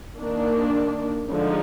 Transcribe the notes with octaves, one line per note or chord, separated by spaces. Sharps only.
D#3 A#3 D4
D3 F3 G#3 D#4